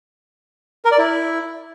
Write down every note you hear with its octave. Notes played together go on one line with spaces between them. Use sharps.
A#4
D5
E4